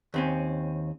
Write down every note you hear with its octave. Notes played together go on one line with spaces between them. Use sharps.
D#2 C4 C#4